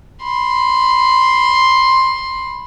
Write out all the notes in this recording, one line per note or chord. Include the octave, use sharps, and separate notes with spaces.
B5 C6